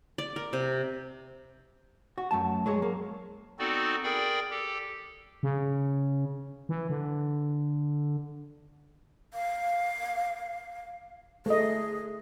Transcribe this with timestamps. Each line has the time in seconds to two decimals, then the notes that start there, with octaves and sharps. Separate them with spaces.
0.18 D5
0.36 A#4
0.53 C3
2.18 F#4
2.31 F#2 A3 A5
2.66 F#3 G#3 G#4 C#5
2.82 A#3
3.59 B3 C4 D#4 F#4 A4 D5
4.04 G#4 A#4 D5 G5 B5
4.51 G4 A4
5.43 C#3
6.69 E3
6.90 D3
9.34 F5
11.46 A3 G#4 D#5